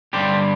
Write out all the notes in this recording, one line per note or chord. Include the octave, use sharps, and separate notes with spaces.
G2 D3 G3 G4 C5